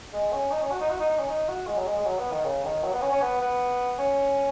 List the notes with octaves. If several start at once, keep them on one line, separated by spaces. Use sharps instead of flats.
G#3
C#4
D#4
C#4
F#4
D#4
F#4
D#4
D#4
C#4
D#4
F#4
G#3
F#3
G#3
G#3
F#3
B3
D#3
C#3
D#3
F#3
B3
C#4
C#4
B3
B3
C#4